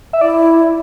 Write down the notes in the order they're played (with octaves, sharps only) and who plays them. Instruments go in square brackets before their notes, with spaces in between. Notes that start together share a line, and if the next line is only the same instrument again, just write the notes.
[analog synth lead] E5
[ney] E4 [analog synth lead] D5